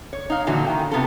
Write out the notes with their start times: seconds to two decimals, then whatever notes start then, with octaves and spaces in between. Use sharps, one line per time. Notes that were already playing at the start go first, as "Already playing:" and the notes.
0.13 C#5
0.30 D#4 F5
0.47 A#2 D3 E3 F#3 F#4
0.67 D#3 G5
0.91 C3 B3 F4 A4